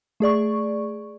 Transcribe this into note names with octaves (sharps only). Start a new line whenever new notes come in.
A3 G#4 D5 C#6